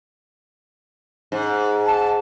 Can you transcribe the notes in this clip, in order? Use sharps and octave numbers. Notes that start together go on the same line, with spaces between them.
G#2
A5